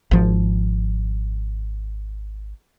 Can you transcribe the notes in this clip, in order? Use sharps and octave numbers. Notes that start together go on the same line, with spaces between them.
G#1 F3